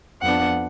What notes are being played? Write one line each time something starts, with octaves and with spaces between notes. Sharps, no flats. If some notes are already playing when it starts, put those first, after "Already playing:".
F2 F3 B3 D4 F#5